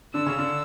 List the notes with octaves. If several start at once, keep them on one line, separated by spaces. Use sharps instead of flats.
D3 D4 E6
C#3 C#4
D3 D4